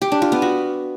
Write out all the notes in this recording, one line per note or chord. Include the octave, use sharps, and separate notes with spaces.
G4
D4
F4
B3
F#4